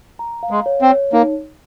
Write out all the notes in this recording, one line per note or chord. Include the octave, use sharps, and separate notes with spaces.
A#5
F5
G#3
C#5
C4
C#5
A#3 D#4